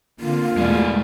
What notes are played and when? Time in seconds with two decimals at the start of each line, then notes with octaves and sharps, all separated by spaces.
0.20 D3 A#3 C4 F4
0.57 E2 B2 G#3 A3 D5